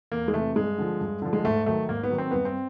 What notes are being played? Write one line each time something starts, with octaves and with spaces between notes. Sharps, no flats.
E2 A#3
G#3
C3 E3 A3
G2 G#3
D3 F3
G2
D3 F3
G#3
G#2 A3
D#3 F#3 A3
G#2 A#3
B3
D#3 F#3
C4
G2 B3
C4